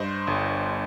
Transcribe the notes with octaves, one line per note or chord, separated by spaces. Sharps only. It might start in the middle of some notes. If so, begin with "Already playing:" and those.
Already playing: G2 C5 D#5
G1